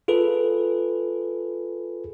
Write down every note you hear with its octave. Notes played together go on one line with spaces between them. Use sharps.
F4 G#4 A4 B4